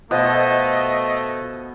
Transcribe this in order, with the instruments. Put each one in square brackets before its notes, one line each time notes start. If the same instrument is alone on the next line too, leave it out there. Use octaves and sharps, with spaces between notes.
[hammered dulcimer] B2 [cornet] A3 [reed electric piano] F4 C5 F5 [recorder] D#5